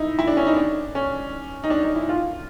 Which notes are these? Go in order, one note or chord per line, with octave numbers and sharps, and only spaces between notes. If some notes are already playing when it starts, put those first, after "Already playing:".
Already playing: D#4 E4
E4
D4
C#4
D#4
D4
C#4
D#4
D4
D#4
E4
F4